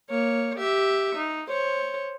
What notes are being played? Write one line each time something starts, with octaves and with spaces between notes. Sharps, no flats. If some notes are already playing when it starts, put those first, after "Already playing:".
A#3 C#5
G4 E5
D#4
C5 C#5